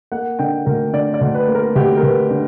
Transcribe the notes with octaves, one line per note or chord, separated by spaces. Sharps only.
A#3 F#5
D3 G5
D2 A#4
D3 D5
D5
D2
B4
A#3
A#4
D2 G4
A#4
D2 B4
D3